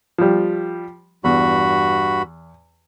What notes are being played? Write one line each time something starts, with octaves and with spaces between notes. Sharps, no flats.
F3 G3
E2 G2 F#4 B5